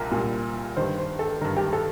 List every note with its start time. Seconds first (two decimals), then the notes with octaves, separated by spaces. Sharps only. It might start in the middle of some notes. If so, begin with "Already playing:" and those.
Already playing: C2 A#2 A#4
0.12 C2 A#2
0.77 G2 D#3 C5
0.98 C5
1.19 A4
1.41 G2 D#3 A#4
1.57 G4
1.73 A4